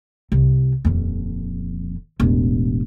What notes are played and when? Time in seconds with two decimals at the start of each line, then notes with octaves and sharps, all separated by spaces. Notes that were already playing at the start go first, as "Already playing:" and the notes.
0.32 C2
0.85 D#1 F2
2.20 E1 A1